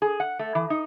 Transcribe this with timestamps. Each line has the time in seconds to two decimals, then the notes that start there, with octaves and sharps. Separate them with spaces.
0.02 G#4
0.20 F#5
0.39 A3
0.55 E3
0.70 D#4